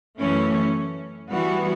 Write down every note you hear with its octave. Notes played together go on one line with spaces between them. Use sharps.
F#2 E3 A3 C#4
E3 G3 B3 F#4